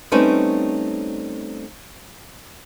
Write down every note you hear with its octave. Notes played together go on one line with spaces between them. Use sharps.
G3 A3 C4 C#4 D#4 B4